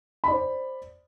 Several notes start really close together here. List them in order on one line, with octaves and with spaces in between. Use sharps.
B5 D5 C5